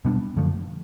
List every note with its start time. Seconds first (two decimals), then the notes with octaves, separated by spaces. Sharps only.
0.05 B2 G3 B3 D4
0.37 F#2 D3 F3 A3